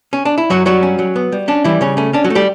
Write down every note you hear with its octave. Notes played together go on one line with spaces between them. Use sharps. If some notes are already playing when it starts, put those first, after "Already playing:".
C#4
D4
E4
F#2 F#3 F#4
F#3 G3 F#4
C#4
F#3
B3
G3
C#4 D4
E3 G3 E4
C#3 C#4
A3 C#4
C#4 D4
F#3 F#4
A3
G3 G4